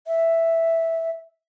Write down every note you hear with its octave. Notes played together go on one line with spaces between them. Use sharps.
E5